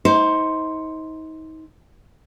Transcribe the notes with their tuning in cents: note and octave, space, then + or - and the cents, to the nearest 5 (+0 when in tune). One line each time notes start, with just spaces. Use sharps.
D#4 +30 C5 +0